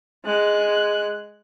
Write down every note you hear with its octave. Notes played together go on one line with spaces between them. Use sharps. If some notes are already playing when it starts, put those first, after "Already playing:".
G#3 F#6